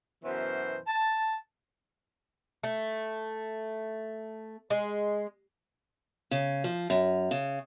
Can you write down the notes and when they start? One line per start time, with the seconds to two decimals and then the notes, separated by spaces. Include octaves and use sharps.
0.24 F#2 B2 E3 B3 A#4 C5
0.87 A5
2.63 A3
4.70 G#3
6.31 C#3
6.64 F3
6.90 F#2
7.31 C#3